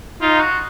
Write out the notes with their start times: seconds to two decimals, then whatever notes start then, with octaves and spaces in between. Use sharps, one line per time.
0.21 D#4 F4
0.40 F#4